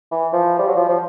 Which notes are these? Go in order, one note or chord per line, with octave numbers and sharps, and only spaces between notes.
E3
F3
G3
F#3
F3
F3